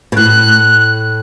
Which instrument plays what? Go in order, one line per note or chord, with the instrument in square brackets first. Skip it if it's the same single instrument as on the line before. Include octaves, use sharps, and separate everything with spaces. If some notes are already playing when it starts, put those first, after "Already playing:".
[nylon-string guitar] B2
[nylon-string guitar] A2 [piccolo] F#6